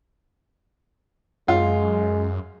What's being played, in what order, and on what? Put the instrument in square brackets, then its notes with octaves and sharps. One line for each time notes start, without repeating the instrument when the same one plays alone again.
[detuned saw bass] F#2 [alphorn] G#3 [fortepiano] F4